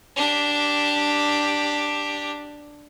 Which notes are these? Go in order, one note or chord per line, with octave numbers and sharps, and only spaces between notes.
D4 G4